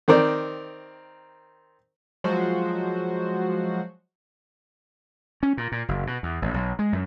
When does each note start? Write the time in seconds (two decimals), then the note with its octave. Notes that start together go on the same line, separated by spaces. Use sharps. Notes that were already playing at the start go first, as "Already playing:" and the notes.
0.08 D#3 C4 A#4 D5
2.24 F3 F#3 G#3 F#4 C5
5.43 C#4
5.57 A#2
5.72 A#2
5.88 F#1
6.07 B2
6.23 E2
6.42 A1
6.54 B1
6.79 G#3
6.93 F#2